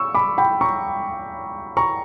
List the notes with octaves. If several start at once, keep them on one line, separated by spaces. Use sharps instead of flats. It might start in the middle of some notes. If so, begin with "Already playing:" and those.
Already playing: C#6 E6
B5 D6
G5 B5
A#5 C#6
A#5 C#6